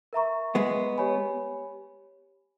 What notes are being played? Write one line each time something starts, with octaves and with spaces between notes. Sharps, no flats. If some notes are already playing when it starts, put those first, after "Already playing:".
A#4 E5 A#5 C#6
G#3 B3
G4 C#5 G#5 B5